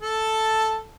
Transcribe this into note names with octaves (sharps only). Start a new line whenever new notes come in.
A4 A5